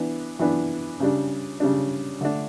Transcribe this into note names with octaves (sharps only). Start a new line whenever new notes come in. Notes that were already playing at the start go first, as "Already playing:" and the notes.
Already playing: E3 B3 D4
E3 B3 D4
C#3 G3 D4
C#3 G3 D4
D3 A3 D4